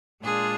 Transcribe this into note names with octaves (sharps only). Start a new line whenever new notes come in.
A#2 G#3 D4 F4 G#4